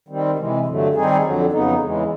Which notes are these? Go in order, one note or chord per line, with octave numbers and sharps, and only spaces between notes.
D#3 G3 C4
C3 E3 G#3
G2 D3 F#3 A3
D#3 G3 C4 D#4 G#4
F2 D3 F#3
F2 C#3 F#3 B3 D#4
E2 C#3 E3 G#3